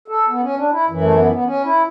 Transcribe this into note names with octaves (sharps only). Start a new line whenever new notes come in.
A4
B3
C#4
D4
E4
F#2 E3
A3
B3
B3
C#4
E4